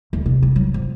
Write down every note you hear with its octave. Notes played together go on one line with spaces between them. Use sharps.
D2
C3
D#4
F#3
F3